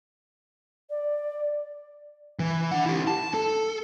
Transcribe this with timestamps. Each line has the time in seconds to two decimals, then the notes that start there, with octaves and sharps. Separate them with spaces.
0.90 D5
2.39 E3
2.71 D4 F#5
2.86 E4 G4
3.07 A5
3.34 A4